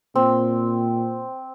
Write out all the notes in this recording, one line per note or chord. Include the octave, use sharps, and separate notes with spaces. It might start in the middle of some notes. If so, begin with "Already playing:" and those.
A#2 C4